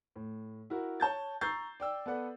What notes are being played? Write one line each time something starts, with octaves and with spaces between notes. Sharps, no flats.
A2
E4 F#4 A#4
C#5 A5 G6 A6
A#5 C#6 E6 G6 A6 C7
D5 G5 E6
B3 A4 B4 D5 F#5